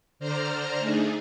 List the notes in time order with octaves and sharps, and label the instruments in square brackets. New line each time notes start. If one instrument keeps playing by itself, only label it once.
[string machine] D3 D4 C5 A#5 F6
A3 D4 D#4 G#4